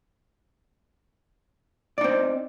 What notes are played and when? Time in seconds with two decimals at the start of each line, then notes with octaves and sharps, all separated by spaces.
1.98 D5
2.01 D#4
2.04 C4